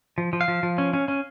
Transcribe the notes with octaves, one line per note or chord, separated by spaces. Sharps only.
F3
F3
F5
F3
F3
C#4
C#4
C#4